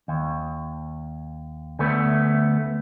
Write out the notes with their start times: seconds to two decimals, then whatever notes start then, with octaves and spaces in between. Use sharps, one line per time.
0.08 D#2
1.79 D2 A3 B3